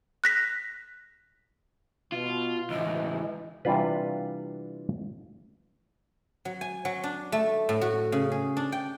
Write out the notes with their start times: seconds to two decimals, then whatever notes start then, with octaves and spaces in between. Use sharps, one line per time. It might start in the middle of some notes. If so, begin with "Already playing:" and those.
0.24 F#6 A#6 B6
2.12 B2 F4
2.70 C#2 A2 E3 D#5
3.65 C3 E3 G3 D4 F4 B4
6.45 F#3
6.61 G#5
6.85 F#3
7.04 D4
7.32 A3
7.69 A2
7.81 F#4
8.12 C#3
8.32 G#4
8.57 D4
8.72 G5